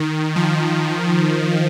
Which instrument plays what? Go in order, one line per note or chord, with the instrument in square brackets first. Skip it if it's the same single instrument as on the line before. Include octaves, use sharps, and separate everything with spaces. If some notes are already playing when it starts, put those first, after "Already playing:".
Already playing: [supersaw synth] D#3
F3